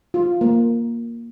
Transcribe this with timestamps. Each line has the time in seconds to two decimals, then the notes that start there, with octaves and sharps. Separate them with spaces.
0.14 F4
0.41 A#3